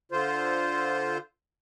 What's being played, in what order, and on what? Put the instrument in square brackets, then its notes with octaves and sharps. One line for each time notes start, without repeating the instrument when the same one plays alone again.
[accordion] D3 F4 C5